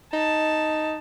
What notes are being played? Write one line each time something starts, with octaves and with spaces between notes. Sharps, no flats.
D#4 A5